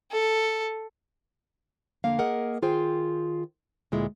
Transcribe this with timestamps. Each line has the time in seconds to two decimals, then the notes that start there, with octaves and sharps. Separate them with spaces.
0.11 A4
2.04 F2 D3 A#3 F5
2.19 A#3 G#4 A#4 D#5 F#5
2.62 D#3 F4 G#4 C5 G5
3.92 D2 A#2 G#3 E4